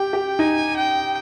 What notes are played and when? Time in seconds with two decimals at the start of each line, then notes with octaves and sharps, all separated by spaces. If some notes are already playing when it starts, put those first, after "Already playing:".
Already playing: G4 G5
0.13 G4
0.39 D#4 G#5
0.77 G5